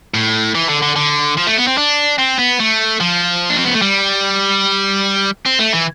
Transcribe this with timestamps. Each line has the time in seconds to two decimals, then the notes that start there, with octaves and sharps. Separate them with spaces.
0.14 A2
0.55 E3
0.69 D3
0.83 D3
0.96 D3
1.37 F3
1.47 A3
1.57 B3
1.67 C4
1.78 D4
2.19 C4
2.39 B3
2.60 A3
3.00 F3
3.50 D4
3.58 C4
3.65 B3
3.74 A3
3.82 G3
5.46 C4
5.59 A3
5.73 E3